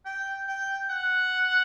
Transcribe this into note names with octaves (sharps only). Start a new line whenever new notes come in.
G5
G5
F#5